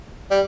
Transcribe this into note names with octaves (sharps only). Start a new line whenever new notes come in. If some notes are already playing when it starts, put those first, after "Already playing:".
G3